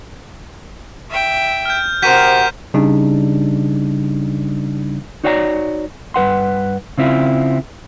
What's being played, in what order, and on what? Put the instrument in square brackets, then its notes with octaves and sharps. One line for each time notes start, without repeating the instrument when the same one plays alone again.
[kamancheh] E5 G5
[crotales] F6 G6
[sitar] C3 F#4 [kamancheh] A#4 C5 [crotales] G6 B6 D#7
[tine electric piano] C#3 G3 D4 D#4
[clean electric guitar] D#4 F#4 C#5 D5 F5 A#5
G2 B4 F#5 C6
C#3 C4 E4 F4